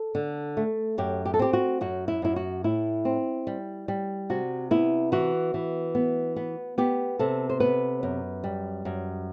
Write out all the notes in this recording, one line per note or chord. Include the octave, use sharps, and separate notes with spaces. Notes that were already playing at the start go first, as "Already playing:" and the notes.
Already playing: A4
D3
A3
F#2 G4
G4
A4
C4 G4
F#4
F#2 F#4
E4
F#2 E4
F#4
A2 E4
C4
G3
G3
C3 F#4
B3 E4
E3 F#4
E3
B3
B3
B3 G4
C3 A4
C5
B3 B4
F#2
G3
F#2